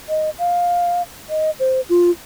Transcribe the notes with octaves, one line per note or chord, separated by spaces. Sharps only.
D#5
F5
D#5
C5
F4